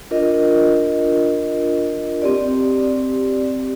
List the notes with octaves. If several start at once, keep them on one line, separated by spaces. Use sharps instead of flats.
D4 F4 A#4 D#5
C4 G4 D5